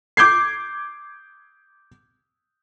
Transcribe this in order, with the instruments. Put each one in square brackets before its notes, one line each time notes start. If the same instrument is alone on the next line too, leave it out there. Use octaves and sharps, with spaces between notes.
[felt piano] D6 G6 G#6 C7